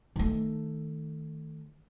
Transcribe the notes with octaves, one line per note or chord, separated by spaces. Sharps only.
D#3 A3